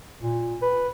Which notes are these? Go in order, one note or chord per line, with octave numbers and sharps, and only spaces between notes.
A#2
B4